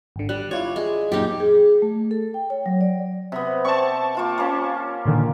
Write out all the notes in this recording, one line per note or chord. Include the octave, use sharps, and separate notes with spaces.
G#1 D3
G3 F#6
E4 F4 C#5 D5
G#3
F#2 A#2 D#4 G4
G#4
A3
A4
G5
C#5
F#3
D5
C3 B3
C4 D5 A5 C#6
A#3 F4 G5
A#3 C#4
A#2 D3 D#3